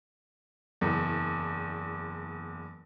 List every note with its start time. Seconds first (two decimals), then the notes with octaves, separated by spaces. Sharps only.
0.81 F#1 E2